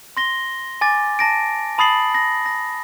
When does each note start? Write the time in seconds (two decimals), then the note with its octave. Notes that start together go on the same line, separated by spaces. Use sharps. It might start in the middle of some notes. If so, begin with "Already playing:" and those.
0.17 C6 A#6 G7
0.81 G#5 D6 A6
1.19 A5 A#6 D7
1.78 A5 B5 D#6 A6 C7 F#7
2.14 A#6
2.46 A#6